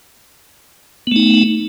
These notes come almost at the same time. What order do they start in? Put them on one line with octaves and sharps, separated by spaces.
B3 A3 D#4